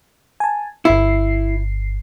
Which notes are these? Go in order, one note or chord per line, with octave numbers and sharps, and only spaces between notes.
G#5 A5
G1 E4 C7